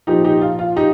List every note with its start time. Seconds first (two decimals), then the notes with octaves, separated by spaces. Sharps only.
0.07 A#2 F3 D#4 G4
0.24 D#4 G4
0.41 F4
0.59 F4
0.76 D#4 G4